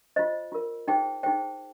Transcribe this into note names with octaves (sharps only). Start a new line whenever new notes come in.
F4 C5 D#5
F4 A#4
D#4 G#4 C5 G5
D#4 G#4 C5 G5